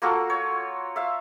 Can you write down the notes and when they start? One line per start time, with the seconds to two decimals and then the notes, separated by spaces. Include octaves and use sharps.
0.02 A#3 F4 F#4 A4
0.30 C#5
0.96 E5 F5